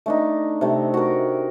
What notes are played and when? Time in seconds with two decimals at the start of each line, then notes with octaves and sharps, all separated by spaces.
0.06 A3 D4 D#4
0.61 C3 A3
0.94 F#4 A#4